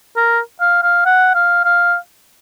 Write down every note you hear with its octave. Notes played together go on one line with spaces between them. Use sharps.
A#4
F5
F5
F#5
F5
F5